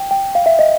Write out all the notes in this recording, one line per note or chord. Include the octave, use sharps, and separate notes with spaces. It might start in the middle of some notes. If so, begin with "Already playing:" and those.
Already playing: G5
G5
F5
E5
D#5